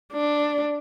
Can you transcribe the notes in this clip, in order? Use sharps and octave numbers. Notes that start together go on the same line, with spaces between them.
D4